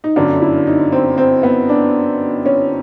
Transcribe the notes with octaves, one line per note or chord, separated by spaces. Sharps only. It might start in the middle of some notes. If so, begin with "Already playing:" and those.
D#4
G1 F#2 D3 D4
E4
D#4
C4
C4
B3
D4
C#4